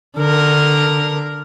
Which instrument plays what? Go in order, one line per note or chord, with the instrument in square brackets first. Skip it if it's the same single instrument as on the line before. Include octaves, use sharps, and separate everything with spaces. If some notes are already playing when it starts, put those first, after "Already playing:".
[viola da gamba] D3 A#4